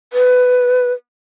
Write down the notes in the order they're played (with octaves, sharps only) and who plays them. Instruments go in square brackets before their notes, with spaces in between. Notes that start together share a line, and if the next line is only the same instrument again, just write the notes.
[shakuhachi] B4